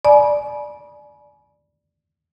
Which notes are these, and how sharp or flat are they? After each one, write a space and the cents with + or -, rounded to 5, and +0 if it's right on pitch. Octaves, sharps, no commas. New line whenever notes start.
D5 +0 G#5 +35 B5 -35